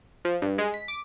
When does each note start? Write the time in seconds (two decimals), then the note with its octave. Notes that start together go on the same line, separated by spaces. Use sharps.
0.25 F3
0.42 G2
0.58 G#3
0.74 B6
0.88 D6